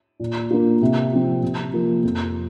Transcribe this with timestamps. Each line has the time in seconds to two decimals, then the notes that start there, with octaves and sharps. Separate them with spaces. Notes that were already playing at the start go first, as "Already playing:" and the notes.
0.20 A#2
0.50 A#3 D4 F4
0.82 C3
1.12 F3 C4
1.43 C3
1.73 F3 A#3
2.04 F2